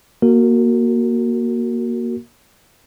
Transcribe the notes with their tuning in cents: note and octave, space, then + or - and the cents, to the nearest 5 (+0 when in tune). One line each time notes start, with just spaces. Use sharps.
A#3 +15 F#4 +10 A#4 -20